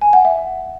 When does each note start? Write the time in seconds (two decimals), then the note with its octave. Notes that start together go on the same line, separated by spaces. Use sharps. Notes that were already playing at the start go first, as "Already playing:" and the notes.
0.01 G#5
0.13 F#5
0.25 E5